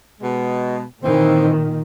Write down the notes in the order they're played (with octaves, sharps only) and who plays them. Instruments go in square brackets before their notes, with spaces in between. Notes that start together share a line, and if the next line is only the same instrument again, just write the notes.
[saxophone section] B2 G#3
[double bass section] A#2 D#3 [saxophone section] E3 C4